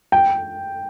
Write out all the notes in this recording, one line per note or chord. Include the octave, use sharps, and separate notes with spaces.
G5